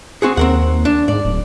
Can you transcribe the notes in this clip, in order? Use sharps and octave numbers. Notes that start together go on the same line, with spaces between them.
C4 F#4 G#4
D#2 C4 A#4 F#5
D4
G#2 D5
D1